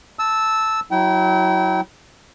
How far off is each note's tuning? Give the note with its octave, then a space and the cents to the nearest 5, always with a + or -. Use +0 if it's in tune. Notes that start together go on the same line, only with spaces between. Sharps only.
A5 +0 E6 -10
F#3 +0 E4 -30 G5 -35